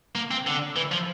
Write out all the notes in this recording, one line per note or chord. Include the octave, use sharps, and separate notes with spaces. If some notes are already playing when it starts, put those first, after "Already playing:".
A#3
C4
D3
E3
F3